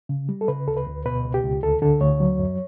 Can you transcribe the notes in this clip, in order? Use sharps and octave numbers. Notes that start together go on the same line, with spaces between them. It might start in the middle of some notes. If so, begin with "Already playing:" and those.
C#3
G3
A4
C#3 B4
D2 A4
B4
D2
B2 B4
C#2
G4
C#2
D2 A4
D3 A4
D2 C#5
F#3
F#2